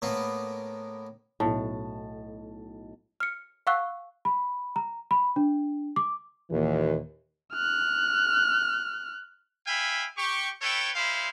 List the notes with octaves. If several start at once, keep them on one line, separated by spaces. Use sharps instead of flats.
A2 A#3 B3
B1 A2 A5
F6 C#7
F5 F#5 C#6 E6 F#6
B5
A#5
B5
D4
D6
D#2 A#2 E3
F6 F#6
E5 F5 G5 G#5 B5
G4 C#6
E4 A4 B4 C#5 G5
G#3 E4 C5 F5 B5